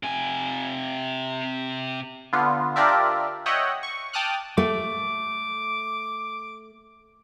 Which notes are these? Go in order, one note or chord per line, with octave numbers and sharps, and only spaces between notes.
C3 G#5
D3 B3 F4
D4 F4 G4 A#4 D5 E5
C#5 D#5 E5 F#5 G5
C#6
G5 A5 D6 D#6 F6 F#6
A3 D6